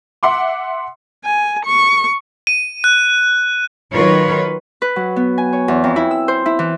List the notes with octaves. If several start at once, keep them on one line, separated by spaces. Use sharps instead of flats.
E5 F#5 C6 D6
G#5
C#6
D#7
F#6
D#3 F#3 F4 A#4 B4 C#5
B4
F#3
B3
G#5
C#5
E2
F2
E4
E6
C5
E4
E3